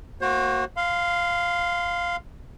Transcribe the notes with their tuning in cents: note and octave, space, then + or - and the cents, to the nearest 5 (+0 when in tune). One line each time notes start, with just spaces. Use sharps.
A#3 +0 F#4 +0 C5 +40
F5 +0 C6 -30